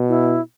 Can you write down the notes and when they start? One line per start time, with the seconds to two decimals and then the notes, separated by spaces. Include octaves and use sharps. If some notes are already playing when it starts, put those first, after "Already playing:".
Already playing: B2
0.09 E4